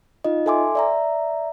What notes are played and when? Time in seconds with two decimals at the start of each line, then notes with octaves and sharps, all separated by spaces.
0.24 D#4 F4 D#5
0.46 A4 E5 G#5 C6 D6
0.75 D5 E5 A#5